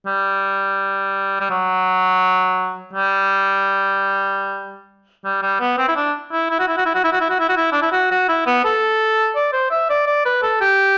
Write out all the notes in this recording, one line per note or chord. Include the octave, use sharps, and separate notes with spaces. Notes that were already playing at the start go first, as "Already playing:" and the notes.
G3
G3
F#3
G3
G3
G3
B3
C4
E4
D4
E4
E4
F#4
E4
F#4
E4
F#4
E4
F#4
E4
F#4
E4
F#4
E4
D4
E4
F#4
F#4
E4
B3
A4
D5
C5
E5
D5
D5
B4
A4
G4